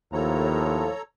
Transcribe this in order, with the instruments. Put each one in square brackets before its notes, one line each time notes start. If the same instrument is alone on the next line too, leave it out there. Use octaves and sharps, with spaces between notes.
[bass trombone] D#2 [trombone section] A2 F3 [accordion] A4 C#5 A#5